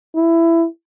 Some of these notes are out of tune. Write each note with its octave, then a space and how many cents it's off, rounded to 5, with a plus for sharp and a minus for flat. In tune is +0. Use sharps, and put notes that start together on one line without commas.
E4 +15